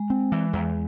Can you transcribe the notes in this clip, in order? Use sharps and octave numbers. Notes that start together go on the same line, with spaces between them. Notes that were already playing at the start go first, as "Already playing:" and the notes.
Already playing: G#3
C4
E3
E2